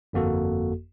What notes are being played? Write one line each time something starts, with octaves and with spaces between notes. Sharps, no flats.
G1 F2 A#3 F#4 A4